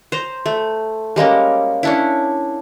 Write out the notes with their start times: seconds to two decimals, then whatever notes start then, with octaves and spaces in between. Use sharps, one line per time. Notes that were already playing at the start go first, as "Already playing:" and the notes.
0.12 C5 A#5
0.46 A3
1.16 G3 G#3 A#3 C#4
1.83 C#4 D4 E4